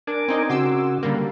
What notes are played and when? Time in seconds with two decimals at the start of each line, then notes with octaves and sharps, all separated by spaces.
0.07 D4 A#4 G#5 D6
0.28 C4 D#4 D#5
0.50 C#3 F#4 C6 D6 E6
1.03 D3 G3 A#3